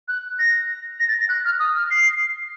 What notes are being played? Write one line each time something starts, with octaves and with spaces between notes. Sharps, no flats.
F#6
A#6
A#6
A6
A#6
F#6
F6
D#6
F6
C7